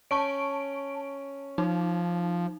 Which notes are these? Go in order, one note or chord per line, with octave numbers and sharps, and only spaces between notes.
C#4 A5 C#6 D7
F3 D#4